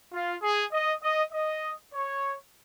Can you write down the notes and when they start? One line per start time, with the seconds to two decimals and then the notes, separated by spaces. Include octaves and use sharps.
0.13 F4
0.42 G#4
0.72 D#5
1.02 D#5
1.32 D#5
1.93 C#5